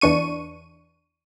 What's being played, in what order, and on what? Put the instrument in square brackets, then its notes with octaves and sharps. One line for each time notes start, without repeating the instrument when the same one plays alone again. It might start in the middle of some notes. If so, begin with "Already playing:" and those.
[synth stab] E2 E3 D4 C#6 D#7